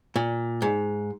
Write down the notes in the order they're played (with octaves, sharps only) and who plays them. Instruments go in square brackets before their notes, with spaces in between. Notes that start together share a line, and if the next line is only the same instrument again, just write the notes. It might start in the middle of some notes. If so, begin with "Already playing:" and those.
[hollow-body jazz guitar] A#2
G#2